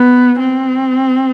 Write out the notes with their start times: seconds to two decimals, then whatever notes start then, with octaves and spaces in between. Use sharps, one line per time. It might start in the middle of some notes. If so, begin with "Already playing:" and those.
Already playing: B3
0.39 C4